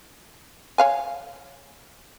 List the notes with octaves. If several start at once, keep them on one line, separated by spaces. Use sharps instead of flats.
C#5 F5 G#5